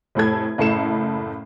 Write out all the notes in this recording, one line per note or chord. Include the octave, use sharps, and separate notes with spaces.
F1 A2 A4 G#6
F#1 A2 A4 C7 C#7 E7